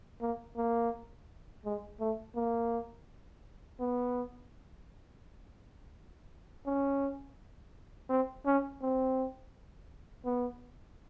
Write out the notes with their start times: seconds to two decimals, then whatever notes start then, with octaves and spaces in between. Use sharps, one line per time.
0.21 A#3
0.57 A#3
1.65 G#3
2.00 A3
2.36 A#3
3.80 B3
6.66 C#4
8.10 C4
8.46 C#4
8.82 C4
10.25 B3